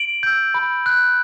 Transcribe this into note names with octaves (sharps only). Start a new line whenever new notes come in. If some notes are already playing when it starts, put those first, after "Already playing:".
Already playing: D7 F#7
E6 G6
B5
F#6